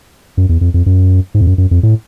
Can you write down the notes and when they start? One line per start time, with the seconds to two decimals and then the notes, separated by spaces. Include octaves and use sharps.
0.37 F#2
0.49 E2
0.61 F2
0.74 F2
0.86 F#2
1.34 G#2
1.41 F2
1.47 F#2
1.58 F#2
1.71 F2
1.83 A2